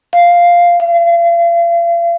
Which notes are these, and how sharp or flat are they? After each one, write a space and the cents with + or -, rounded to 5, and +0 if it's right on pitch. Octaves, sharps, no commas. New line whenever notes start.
F5 +0
F5 -40